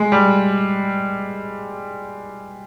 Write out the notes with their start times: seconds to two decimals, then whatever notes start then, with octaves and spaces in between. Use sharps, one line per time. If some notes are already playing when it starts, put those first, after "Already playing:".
Already playing: G#3
0.12 G3